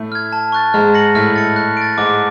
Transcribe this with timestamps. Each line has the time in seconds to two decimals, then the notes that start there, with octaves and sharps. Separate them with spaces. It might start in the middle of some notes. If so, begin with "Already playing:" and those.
Already playing: A2 A3
0.12 F6 G#6
0.32 A5
0.52 C#6 F#6 A6
0.74 G#2 G#3 F6
0.94 A#6 C#7 F#7
1.15 A2 A3 F6
1.36 A6 C#7
1.56 F#6
1.77 A6 D7
1.98 G#2 G#3 D6